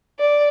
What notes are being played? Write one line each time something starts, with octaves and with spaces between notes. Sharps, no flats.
D5